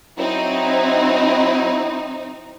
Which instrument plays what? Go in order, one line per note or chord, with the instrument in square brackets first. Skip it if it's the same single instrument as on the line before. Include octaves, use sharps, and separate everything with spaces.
[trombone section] F#3 E4 [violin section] C4 D#4